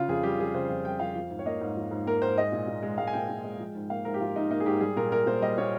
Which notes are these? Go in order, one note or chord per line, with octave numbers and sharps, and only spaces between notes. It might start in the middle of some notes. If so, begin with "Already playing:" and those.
Already playing: C#3 F4
F2 G#4
G3 G4
F2 G#4
C#3 C5
F2
G3 G5
F2 F5
F3
G#2
C#5
A#3 D#5
G#2
F3
G#2
A#3 A#4
G#2 C5
G#3 D#5
A#2
A#2
G#3
G#3 F5
G#5
A#2 G5
A#2
G#3
F3
G#2
A#3 F5
G#2 A#4
G4
F3 F4
G#2 D#4
A#3 D#4
G#4
G#2 G4
G3 G#4
A#2 A#4
A#3 A#4
A#2 C5
G3 D#5
A#2 C#5